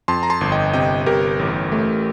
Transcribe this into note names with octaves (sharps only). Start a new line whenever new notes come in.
F2 A5 C6
A#5
A5 C6
G1
D#5 G5
C3 D#5 G5
G1 G4 A#4
A1
A3